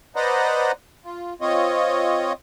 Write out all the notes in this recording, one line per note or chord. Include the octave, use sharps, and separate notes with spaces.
B4 C5 D5 D#5 F#5 A#5
F4
C4 F4 C#5 D#5